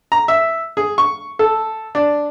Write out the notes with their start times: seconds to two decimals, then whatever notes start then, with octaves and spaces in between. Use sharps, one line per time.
0.12 A#5
0.28 E5
0.77 G#4
0.98 C#6
1.39 A4
1.95 D4